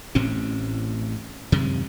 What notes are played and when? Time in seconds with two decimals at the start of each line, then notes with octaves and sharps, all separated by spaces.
0.15 A1 A2 C4 C#4
1.52 F#2 C3 D#3 G#3